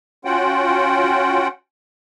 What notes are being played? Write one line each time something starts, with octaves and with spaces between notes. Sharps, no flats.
C#4 F4 F#4 F#5 G5